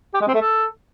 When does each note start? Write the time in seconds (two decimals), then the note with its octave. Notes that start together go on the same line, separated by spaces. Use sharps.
0.14 G4
0.21 G#3
0.28 C4
0.34 A3
0.41 A4